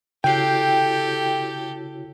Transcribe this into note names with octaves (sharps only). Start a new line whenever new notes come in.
C#3 E4 F#4 G4 A4 C#5 G5 C7